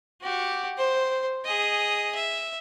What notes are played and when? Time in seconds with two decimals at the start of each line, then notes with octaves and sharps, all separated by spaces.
0.22 F#4 G4
0.78 C5
1.46 G#4 D#5
2.15 E5